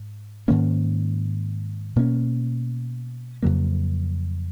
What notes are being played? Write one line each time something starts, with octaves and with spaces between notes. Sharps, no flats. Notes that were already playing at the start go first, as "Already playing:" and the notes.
Already playing: G#2
G#2 D#3 A#3 C#4
B2 A#3 C#4
F2 C#3 F#3 A#3